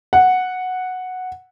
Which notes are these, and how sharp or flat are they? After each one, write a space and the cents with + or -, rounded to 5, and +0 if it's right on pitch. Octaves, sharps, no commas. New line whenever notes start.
F#5 -5